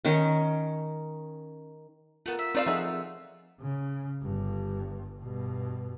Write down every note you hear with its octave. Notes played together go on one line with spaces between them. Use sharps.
D#3 C#4
A3 B3 F4 A#4
E5
A3 C4 D#4 F4 D5 F5 E6
F3 D#4 G#4 D#5 E5 F#5
C#3
G1 G2
G2 B2